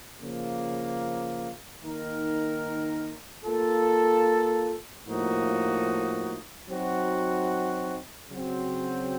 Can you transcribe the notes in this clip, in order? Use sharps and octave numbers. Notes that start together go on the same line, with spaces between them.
C#3 F3 A#3
D#3 A#3 D#4 A#4
A#3 F4 A4
A2 F3 A#3 D#4 F#4
F#3 C4 D#4 F#4
C#3 F#3 C4 F#4